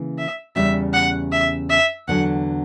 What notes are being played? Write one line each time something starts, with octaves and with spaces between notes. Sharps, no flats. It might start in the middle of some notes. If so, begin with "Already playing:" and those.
Already playing: C#3 E3 A#3
E5
E2 C#3 G3 C#4 E5
F#5
E5
E5
E2 D3 F#3 F#5